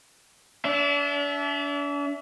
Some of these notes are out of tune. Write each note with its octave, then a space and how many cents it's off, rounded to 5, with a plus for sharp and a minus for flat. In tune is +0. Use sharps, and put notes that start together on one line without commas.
D4 -40 E5 +0